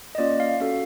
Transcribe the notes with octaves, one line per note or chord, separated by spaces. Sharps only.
D#5
A#3 C#4 F4 D5
F5
C#4 F#4 A4 F5